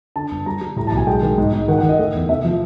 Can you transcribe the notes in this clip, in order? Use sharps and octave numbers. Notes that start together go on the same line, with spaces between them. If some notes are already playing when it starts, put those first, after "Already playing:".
D3 A5
G1
G3 A#5
G3
A2 A#5
B1 A5
G#5
G#3 G5
D#3
G#2
G#2
D#3 F#5
F#5
D#3
D#5
A3
E2
C3 E5
F3